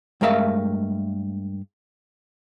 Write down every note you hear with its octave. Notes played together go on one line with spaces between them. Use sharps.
G2 G#3 A3 A#4 E5 F5